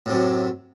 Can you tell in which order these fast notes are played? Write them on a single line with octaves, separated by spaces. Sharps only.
A2 C3 F#2